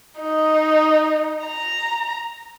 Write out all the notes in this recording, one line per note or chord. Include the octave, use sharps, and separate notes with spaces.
D#4
A#5